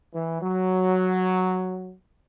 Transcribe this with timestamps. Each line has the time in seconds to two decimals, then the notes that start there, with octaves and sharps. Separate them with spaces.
0.13 E3
0.41 F#3